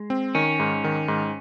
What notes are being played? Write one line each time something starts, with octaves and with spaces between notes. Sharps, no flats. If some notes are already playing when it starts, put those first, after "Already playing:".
Already playing: G#3
C4
D#3 C#4
G#2
D#3
G#2